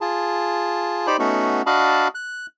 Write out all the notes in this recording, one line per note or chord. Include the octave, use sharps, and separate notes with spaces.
F4 G#4 A5
D#4 G4 C5 D5 B5
A3 B3 C#4 D#4 F#4
D4 F#4 D#5 F5 A5 B5
F#6